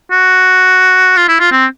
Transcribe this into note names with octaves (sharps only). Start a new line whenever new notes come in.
F#4
F4
E4
F4
C4